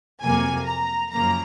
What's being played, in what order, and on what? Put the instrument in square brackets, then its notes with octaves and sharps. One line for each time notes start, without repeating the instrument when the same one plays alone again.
[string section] F2 C3 F#3 A#3 G#5
A#5
F#2 C#3 F3 A#3 A#5